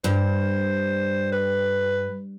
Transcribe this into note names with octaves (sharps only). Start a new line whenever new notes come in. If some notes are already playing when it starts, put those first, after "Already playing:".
G2 C5
B4